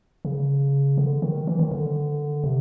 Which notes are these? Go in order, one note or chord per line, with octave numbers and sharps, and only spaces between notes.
C#3
D3
D#3
E3
D#3
D3
C3